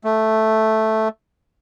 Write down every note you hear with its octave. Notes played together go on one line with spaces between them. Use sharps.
A3